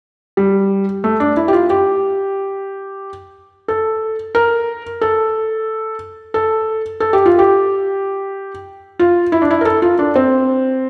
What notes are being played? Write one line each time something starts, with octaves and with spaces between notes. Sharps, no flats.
G3
A3
D4
E4
G4
F4
G4
A4
A#4
A4
A4
A4
G4
F4
G4
F4
E4
D4
E4
A#4
A4
F4
D4
C4